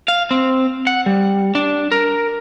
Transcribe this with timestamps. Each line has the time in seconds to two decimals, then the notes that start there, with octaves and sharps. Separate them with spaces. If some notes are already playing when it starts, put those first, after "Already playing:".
0.08 F5
0.31 C4
0.87 F#5
1.06 G3
1.55 D4
1.92 A#4